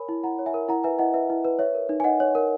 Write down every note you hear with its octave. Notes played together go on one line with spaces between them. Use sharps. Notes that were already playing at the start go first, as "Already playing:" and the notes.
Already playing: A#4 C#5 G#5 B5
E4
E4 F#5 A#5
C#5
E5 G#5
A#4
E4 F#5 A#5
B4 E5 G#5
E4 D#5 F#5
B4 E5
E4
B4
C#5 E5
A#4
D#4
G#5
D#4 D#5 F#5
C#5
A#4